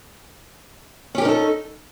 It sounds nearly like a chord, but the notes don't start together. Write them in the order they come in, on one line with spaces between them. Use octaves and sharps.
C#4 G4 A#4 D#4 A4